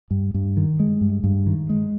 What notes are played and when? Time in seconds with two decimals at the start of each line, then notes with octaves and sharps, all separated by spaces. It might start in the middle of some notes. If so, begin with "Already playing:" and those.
0.11 G2
0.34 G2
0.57 D#3
0.80 G#3
1.01 G2
1.24 G2
1.47 D#3
1.70 G#3